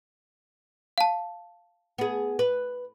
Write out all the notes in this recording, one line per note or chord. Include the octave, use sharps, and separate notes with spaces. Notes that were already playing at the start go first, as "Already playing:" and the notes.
F5 A5
B3 G#4
B4